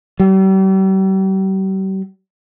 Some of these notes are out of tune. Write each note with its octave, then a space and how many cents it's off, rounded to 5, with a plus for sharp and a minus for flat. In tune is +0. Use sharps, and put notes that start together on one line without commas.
G3 -40